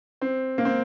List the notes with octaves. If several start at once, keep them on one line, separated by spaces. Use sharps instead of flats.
C4
A#3
C4